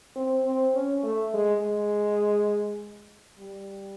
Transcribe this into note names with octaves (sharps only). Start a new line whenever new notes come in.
C4
C4
C#4
A3
G#3
G#3
G3